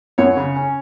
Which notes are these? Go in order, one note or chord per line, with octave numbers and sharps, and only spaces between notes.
F#2 C#5
C#3
C#4